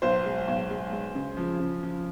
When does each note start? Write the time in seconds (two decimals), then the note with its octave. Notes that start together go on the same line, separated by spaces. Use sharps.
0.02 B1 C5
0.25 G#3
0.48 B1
0.70 G#3
0.92 G#3
1.15 C#3
1.37 F3
1.59 C#3
1.83 F3